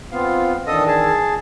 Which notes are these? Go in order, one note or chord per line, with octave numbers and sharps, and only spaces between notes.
B3 C4 F4 F5
D#3 E3 D4 A4 D#5 D#6
G#4 A5